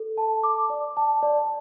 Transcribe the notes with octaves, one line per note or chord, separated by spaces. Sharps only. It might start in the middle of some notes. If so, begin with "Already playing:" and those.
Already playing: A4
A5
D6
D5
A5
D5